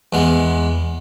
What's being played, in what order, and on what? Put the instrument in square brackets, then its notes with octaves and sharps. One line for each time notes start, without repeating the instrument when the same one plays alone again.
[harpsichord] E2 G#3 B3